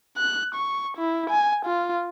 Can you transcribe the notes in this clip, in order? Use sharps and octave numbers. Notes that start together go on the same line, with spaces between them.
F#6
C#6
E4
G#5
F4